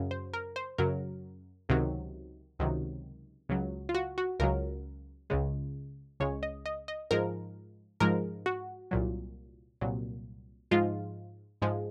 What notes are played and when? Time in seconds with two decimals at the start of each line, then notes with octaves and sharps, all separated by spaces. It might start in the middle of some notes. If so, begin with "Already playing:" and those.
Already playing: F#2 C#3 F#3
0.11 C5
0.34 A#4
0.56 C5
0.78 F#2 C#3 F#3 A#4
1.69 C#2 C3 D#3 F#3
2.59 C#2 C3 D#3 F#3
3.49 C#2 C#3 F#3
3.89 F4
3.95 F#4
4.18 F#4
4.40 C#2 C#3 F#3 A#4
5.30 C#2 C#3 G#3
6.20 C#2 C#3 G#3 C#5
6.43 D#5
6.66 D#5
6.88 D#5
7.11 G#2 F3 G#3 A#4
8.00 G#2 F3 G#3 A#4
8.46 F#4
8.91 C2 A#2 F#3
9.81 C2 A#2 F#3
10.71 G#2 F3 G#3 F4
11.62 G#2 F3 G#3